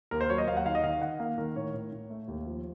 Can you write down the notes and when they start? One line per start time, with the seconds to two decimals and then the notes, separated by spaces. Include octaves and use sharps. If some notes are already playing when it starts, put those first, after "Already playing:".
0.11 D#2 A#4
0.21 C5
0.29 F#3 C#5
0.38 D#5
0.47 D#2 F5
0.57 F#5
0.66 D#3 F5
0.75 D#5
0.84 D#3 F5
1.02 D#3 F#5
1.20 A#3 F5
1.38 D#3 A#4
1.56 A2 C#5
1.74 A2
1.92 A2
2.10 A3
2.28 D#2
2.46 F3